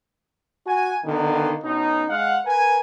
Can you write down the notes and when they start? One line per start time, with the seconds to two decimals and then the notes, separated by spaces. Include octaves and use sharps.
0.66 F#4 G#5
1.05 B2 D3 D#3 A#3 B3
1.64 B2 C#4 D#4
2.10 G#3 F5 F#5
2.46 A#4 B4 G#5